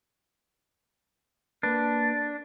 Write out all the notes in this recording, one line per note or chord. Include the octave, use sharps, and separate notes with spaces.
A#3 D4 B4